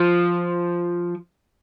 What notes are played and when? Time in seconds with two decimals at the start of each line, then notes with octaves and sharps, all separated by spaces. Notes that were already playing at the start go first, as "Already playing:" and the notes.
Already playing: F3